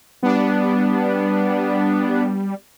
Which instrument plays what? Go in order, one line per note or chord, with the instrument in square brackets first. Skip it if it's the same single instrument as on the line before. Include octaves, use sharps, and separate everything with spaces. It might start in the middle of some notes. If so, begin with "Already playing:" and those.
[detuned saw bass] G3 [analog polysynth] B3 D4